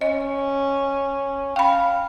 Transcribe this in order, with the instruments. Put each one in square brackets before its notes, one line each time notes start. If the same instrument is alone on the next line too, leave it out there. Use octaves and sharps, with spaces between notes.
[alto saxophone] C#4 [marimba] D#5
[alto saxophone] F5 [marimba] G5 B5